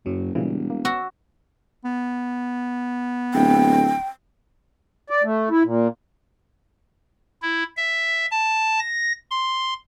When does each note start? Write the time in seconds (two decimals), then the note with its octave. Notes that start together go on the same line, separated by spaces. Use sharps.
0.06 F#1 F#2 F#3
0.35 E1 A#2 C#3 E3 G3
0.70 A#3
0.85 B3 F#4 E6
1.84 B3
3.34 D1 G5
5.10 D5
5.24 A3
5.50 E4
5.64 A#2
7.42 E4
7.77 E5
8.31 A5
8.80 A#6
9.31 C6